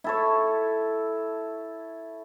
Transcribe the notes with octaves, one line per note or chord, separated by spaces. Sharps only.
E4 A4 C#5